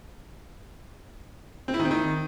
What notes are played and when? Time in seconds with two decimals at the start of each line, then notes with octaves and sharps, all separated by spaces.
1.68 C4
1.74 E4
1.79 D#3
1.85 C4
1.91 D#3